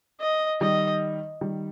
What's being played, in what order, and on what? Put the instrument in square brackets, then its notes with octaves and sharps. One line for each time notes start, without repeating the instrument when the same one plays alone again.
[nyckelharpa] D#5
[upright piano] D#3 G3 [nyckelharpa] D#5
[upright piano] D#3 G3